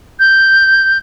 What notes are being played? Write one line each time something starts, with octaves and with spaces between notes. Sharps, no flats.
G6